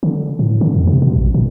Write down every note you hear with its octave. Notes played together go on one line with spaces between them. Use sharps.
D3
A2
D3
F2
C3
B2
A#1
A#2